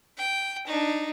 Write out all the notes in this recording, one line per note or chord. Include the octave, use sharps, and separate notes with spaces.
G5
D4 D#4